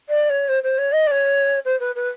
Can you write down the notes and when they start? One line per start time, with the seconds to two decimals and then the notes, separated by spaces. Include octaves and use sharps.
0.09 D5
0.30 C#5
0.48 C5
0.63 C5
0.78 C#5
0.92 D#5
1.07 D5
1.11 C#5
1.65 C5
1.80 B4
1.95 B4